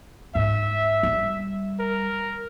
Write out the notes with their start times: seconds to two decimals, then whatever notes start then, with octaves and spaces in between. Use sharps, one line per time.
0.35 G#2 E5
1.03 G3
1.79 A#4